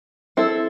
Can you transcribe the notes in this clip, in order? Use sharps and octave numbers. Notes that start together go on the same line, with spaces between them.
C4 E4 A4